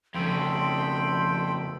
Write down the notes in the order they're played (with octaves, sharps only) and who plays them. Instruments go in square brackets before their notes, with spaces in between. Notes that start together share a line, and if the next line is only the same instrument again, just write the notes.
[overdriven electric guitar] F2 C#3 [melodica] A4 G5 B5 [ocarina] C6